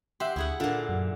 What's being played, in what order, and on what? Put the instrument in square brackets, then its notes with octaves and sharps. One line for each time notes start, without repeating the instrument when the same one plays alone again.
[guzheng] G4 [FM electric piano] E5 F#5 C6
[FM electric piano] D2 [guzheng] E4 G#4 F#5
[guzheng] A#2 D3 [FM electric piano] F4
[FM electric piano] F#2